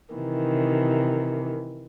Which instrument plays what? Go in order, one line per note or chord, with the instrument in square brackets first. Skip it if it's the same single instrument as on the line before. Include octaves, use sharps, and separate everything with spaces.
[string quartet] C3 D#3 E3